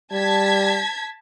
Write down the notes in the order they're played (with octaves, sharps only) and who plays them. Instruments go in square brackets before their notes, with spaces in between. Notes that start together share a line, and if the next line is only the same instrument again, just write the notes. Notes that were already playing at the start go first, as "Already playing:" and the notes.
[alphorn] G3 [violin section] A5 G#6 B6